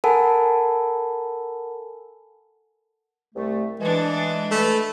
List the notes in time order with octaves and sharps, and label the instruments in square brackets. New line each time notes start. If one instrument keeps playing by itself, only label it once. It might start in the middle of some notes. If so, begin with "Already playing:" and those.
[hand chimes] A4 A#4 F#5 G#5 A5 B5
[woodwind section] C2 A3
[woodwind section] E3 [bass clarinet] G#3 [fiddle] D4 A4
[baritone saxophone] A3 [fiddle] B4